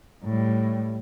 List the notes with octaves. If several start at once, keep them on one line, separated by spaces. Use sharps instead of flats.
A2 G3